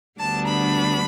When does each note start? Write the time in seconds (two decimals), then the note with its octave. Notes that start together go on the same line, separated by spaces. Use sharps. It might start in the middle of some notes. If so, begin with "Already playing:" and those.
0.19 D2 D3 G3 B3 D4 A5
0.47 B5